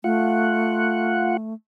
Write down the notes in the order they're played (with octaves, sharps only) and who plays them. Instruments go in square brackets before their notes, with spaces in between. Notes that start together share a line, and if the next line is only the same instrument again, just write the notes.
[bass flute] A3 [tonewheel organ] F4 F#5